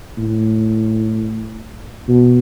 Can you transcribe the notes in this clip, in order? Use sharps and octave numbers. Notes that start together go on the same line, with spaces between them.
A2
B2